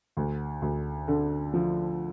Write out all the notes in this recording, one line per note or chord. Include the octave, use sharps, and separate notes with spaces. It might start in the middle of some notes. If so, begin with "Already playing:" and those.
D2
D2
D3
F3